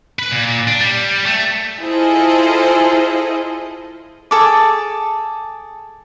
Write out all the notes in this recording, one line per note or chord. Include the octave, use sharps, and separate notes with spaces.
B4
A#2
D4
G3
A3
E4 F4 G#4 A4 C5 D#5
G#4 A4 D6